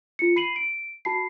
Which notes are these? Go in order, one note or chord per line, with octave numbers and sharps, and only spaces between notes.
F4 C#7
B5 C7 D#7 F#7
D7
F#4 A5 B5 C7